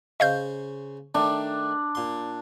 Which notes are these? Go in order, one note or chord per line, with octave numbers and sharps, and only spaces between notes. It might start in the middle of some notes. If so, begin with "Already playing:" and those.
C#3 C5 D#5 F5 C#6 G6
D#3 A3 D4
A#2 C6